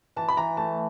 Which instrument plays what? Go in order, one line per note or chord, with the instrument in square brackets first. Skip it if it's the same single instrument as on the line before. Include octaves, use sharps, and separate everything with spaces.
[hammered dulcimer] E3 [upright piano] A5
[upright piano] B5
[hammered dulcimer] E3 [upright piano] A#5
[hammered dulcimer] A3 [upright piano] A5